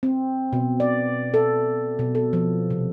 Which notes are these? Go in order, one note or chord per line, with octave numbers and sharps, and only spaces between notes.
C4
B2
D5
A4
B2
A4
F3
C3